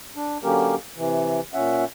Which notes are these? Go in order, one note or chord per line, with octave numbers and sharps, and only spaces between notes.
D4
D3 F#3 A#3 C#4 G4 A#4
C3 E3
A#2 C#4 E5 F#5